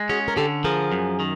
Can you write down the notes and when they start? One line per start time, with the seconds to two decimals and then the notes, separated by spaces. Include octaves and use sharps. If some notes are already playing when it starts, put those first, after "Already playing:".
Already playing: G#3
0.09 C#4 F#4 G#4
0.28 A#4
0.37 D3 G4 A4
0.64 F3 G#4 A#4
0.92 F#2
1.20 D#3